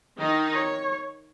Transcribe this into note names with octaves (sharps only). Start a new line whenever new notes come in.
D#3 D#4
C#5